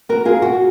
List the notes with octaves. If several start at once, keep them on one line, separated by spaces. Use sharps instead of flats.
F#4 A#4
F4 G#4
F#4